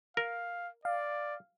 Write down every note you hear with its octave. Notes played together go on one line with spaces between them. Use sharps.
A#4 F5
D5 F5